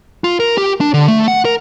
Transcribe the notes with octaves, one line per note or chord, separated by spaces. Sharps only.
F4
A#4
G4
D4
D3
A3
F#5
A#4